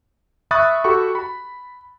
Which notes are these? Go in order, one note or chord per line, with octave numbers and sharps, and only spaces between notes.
E5 B5 C#6 D#6 F#6 A6
F#4 G4 A4 B5 C#6
B5